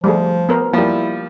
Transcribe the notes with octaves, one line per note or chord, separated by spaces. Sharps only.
F3 G3 A3 G#4
B3 A#4 C5
F3 G3 A#3 E4